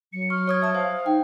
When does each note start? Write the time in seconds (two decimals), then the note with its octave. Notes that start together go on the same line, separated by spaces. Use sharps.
0.13 F#3 C#7
0.30 C#6 F6
0.47 C#5 D#6 G#6
0.62 E5 A5 D#6
0.75 C5 F5
1.06 D#4 G5